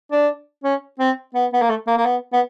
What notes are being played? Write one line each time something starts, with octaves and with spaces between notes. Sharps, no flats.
D4
C#4
C4
B3
B3
A#3
A3
A#3
A#3
B3
B3